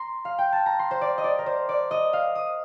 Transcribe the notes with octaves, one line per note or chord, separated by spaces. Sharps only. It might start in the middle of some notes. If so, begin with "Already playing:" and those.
Already playing: A#5 C6
F5
G5
A5
A#5
C6
C5
D5
D#5
D5
A#4
C5
D5
D#5
F5
D#6